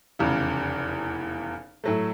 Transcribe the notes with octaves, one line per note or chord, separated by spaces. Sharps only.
F1 E2 C#3
A2 F#3 A3